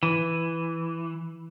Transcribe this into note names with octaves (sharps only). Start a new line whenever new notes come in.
E3